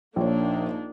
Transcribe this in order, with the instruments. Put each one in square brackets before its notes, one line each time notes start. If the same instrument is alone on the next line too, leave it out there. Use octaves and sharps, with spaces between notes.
[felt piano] A#1 C#5 [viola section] A#3 D4 D#4